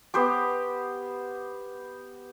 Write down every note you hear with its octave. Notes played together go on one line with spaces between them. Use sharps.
B3 G4 C5 D6